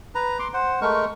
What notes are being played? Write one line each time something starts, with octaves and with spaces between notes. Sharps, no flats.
B4 A#5
C6 D6
C5 F#5
G#3 A3 A#4 C#6